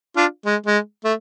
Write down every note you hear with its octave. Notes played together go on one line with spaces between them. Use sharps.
D4 F4
G#3
G#3
A3